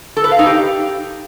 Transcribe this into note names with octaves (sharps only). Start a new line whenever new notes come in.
A4
B4
F5
D#4
G4